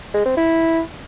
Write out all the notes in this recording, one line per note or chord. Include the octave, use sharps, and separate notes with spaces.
G#3
C4
E4